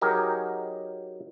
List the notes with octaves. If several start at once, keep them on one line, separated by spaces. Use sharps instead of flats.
F#3 D#4 G4 G#4 A#4 D#5